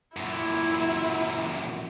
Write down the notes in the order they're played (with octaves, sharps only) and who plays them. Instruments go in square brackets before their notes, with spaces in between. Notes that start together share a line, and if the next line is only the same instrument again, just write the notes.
[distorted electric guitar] F#2 A#2 [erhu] E4